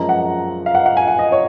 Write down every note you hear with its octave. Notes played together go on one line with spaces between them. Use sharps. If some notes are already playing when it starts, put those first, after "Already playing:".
Already playing: F#2 F3 G#3 A#5
F#5
F5
F#5
F#5
G#5
F#5
D#5
C#5